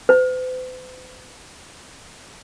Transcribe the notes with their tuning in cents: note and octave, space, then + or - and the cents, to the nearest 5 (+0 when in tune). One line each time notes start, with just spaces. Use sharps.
C5 -45